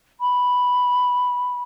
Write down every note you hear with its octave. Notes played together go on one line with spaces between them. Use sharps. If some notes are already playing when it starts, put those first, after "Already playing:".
B5